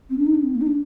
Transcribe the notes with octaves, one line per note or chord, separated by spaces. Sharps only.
C4
D4
D#4
D4
C4
A#3
D#4
D4